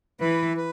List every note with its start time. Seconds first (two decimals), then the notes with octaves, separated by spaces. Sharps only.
0.20 E3 B4
0.57 B4